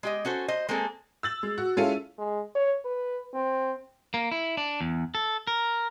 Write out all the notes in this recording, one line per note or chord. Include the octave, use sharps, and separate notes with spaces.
G#3 G4 D#5
C#4 F#4 A4 C5
C5 D#5
G#3 A#3 C4 G#4 A4
E6 A6 F#7
G#3
F#4
G#3 C#4 E4 F4 A4 D#7
G#3
C#5
B4
C4
A#3
E4
D4
E2
A4
A#4